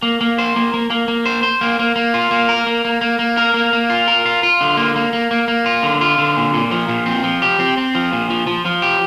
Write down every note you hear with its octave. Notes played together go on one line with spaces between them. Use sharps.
A#3
A#3
C5
A#3
A#3
A#3
A#3
C5
C5
A#3
A#3
A#3
F4
A#3
A#4
A#3
A#3
A#3
A#3
A#4
A#3
A#3
F4
A#4
F4
F4
D3
A#3
A#3
A#3
A#3
A#3
F4
D3
F4
D3
A#2
A#2
F3
A#2
C4
F3
G4
C4
C4
F3
A#2
F3
F3
F3
G4